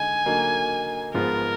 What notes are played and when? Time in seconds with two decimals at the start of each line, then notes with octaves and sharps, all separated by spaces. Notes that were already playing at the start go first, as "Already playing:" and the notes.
Already playing: D3 G#3 D#4 G#5
0.26 D3 F#3 A#3 D#4
1.14 G#2 F3 B3 F4 A#4